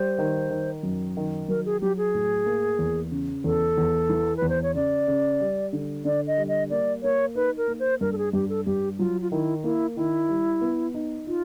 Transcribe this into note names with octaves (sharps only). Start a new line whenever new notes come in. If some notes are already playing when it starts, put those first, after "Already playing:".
Already playing: G3 C5
D#3
D#3
F#2
D#3
F#3 A#4
G#4
F#3 G4
G#4
A2
A#3
E2
C#3
E2 A4
E2
E3
B4
E2
C5
C#5
C#3 D5
C#3
G3
D3
D3 D5
D#5
G3
D#5
A#3 D5
A#3 C#5
D#4 B4
A#4
A#3
C5
G2 A#4
A4
G#4
G2 G4
A4
G2 G4
F#3 F4
F4
D#3 E4
A#3 E4
D#3 E4
G3
B3
D#4
D#4 F4